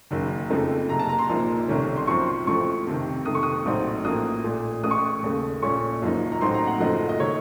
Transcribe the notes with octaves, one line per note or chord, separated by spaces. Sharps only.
F#1 F#2 D#3
F2 C#3 F3 A3 D#4
F#1 F2 C3 A#5
A5
A#5
C6
A#1 A#2 F3 A#3 D#4
C2 C3 D#3 A3 C#4
C6
F#2 F3 C4 C#6
A1 A2 F3 C#6
F2 C3 D#3
F2 C3 D#3 A3 D#6
C#6
D#6
A#1 A2 F#3 C4 D#4
A1 A2 F3 A#3 D#6
A#1 A#2 A3
A1 A2 A3 D#6
C#6
D#6
D#2 C#3 A3
A#1 A#2 A3 C#4 C#6
F#1 F#2 F3 A#3 D#4
A#5
A1 A2 F#3 C4 D#4 C6
A#5
F#5
F#1 F#2 F3 A3 D#5
D#5
D#3 A3 C#5